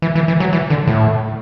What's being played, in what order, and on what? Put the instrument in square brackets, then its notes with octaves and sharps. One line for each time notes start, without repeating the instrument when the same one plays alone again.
[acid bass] E3
E3
E3
F#3
E3
D3
A2